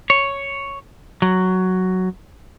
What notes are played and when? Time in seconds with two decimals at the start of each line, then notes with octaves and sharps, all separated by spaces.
0.10 C#5
1.22 F#3